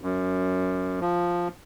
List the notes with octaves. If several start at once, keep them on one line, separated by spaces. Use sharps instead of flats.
F#2
F3